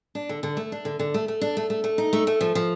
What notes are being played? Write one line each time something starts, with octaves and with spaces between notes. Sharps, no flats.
D4
D3
D3
A3
D4
D3
D3
A3
A3
D4
A3
A3
A3
D#4
A3
A3
F3
F3